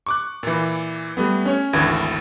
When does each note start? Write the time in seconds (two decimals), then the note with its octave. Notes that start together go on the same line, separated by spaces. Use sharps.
0.06 C#6 D6 F#6
0.43 A#2 E3
1.17 G3 A3 B3
1.45 C#4 C#5
1.73 G#1 D2 E3 G#6